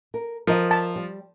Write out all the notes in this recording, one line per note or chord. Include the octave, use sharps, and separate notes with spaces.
A#4
F3 A#4 D#5
A5
G3